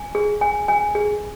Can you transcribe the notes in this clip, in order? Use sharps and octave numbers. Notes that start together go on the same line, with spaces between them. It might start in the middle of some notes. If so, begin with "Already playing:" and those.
Already playing: G#5
G#4
G#5
G#5
G#4